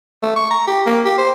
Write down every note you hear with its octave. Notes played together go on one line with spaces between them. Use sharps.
A3
C#6
A#5
G4
A#3
G4
C5